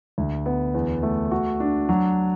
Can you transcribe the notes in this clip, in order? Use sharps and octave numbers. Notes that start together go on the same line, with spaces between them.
D2
B3
E2
A3
F#4
D4
F#3